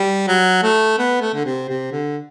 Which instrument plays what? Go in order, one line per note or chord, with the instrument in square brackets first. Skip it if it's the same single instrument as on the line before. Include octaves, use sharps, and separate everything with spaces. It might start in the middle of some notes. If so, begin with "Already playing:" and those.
Already playing: [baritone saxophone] G3
F#3
A3
B3
A3
D3
C3
C3
D3